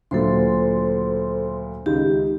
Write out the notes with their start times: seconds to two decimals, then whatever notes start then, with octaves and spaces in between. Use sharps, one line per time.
0.11 D2 A#2 F#3 A4 C5 C6
1.86 C#2 D#3 G4